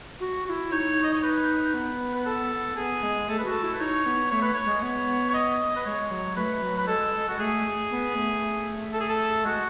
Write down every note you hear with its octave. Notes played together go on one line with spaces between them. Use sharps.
F#4
F#4
E4
D#4 C#5
D#5
C#5
B4
B3
B4
A4
B3 G#4
G#3
A3 A4
B4
F#4 A4
E4
B4
D#4 C#5
B3
A3 C#5
B4
C#5
G#3
B3
C#5
D#5
B4
G#3 C#5
F#3
A3 B4
F#3
B4
G#3 A4
G#3
G#3 F#4
A3 G#4
B3
A3
A4
G#4
A4
G#3 F#4